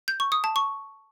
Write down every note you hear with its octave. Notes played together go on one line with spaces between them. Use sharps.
G6
C#6
D#6
A5
C#6